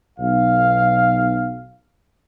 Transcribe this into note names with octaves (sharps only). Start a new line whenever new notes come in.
B1 F5